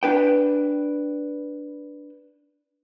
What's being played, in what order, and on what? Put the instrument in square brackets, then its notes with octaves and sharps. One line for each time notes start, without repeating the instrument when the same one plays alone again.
[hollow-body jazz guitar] D4 B4 G5